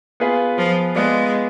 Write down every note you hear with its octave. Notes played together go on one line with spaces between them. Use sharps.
B3 F4 G#4 B4
F3
G#3 B3 F4 G#4 D5